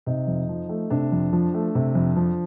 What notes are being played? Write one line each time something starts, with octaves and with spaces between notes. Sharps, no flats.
C3 D#4
F2
F3
A3
C3 D4
F2
F3
A3
C3
F2
F3